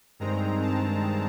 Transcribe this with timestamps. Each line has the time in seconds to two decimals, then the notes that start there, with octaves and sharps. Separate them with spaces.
0.19 G2 D#3 G#3 C4 A#5
0.62 A5